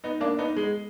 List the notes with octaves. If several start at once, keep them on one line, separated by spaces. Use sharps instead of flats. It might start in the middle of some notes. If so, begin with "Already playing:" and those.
B3 D#4
A#3 D4
B3 D#4
G#3